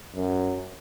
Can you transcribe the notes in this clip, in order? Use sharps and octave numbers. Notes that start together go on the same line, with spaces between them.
F#2